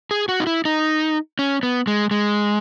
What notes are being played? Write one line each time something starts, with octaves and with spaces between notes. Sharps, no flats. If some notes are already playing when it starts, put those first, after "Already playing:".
G#4
F#4
D#4
E4
D#4
C#4
B3
G#3
G#3